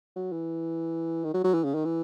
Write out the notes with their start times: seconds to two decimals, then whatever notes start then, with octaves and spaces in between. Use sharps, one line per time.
0.16 F#3
0.32 E3
1.24 D#3
1.34 F#3
1.44 F#3
1.54 E3
1.64 C#3
1.75 D#3
1.85 E3